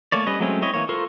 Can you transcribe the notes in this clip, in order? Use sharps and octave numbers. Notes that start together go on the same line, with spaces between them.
A3 A#3 C#5 D5
G3 C#4 B4 D#5
F#3 G#3 A3 C4 C#4
C4 E4 C#5 D#5
E3 A#3 C#5
F4 A4 A#4 C5 C#6